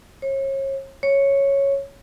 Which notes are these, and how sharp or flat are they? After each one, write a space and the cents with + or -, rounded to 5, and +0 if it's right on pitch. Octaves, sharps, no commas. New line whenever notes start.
C#5 -35
C#5 -5